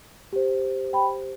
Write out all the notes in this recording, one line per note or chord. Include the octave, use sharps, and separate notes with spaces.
G4 C5
G5 B5